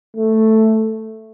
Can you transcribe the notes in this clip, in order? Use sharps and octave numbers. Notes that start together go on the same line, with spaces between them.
A3